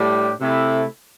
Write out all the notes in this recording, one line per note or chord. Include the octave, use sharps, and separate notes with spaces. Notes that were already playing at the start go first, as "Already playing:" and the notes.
Already playing: A2 G3 D4 G4
C3 A3 E4